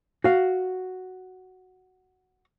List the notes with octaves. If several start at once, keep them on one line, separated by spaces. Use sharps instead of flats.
F#4 F5